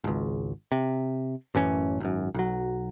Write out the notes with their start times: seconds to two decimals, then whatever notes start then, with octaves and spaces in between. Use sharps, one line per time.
0.04 G#1 C#2
0.72 C3
1.55 A1 F#2 E3 C#4
2.00 G#1 F#2
2.34 B1 F#3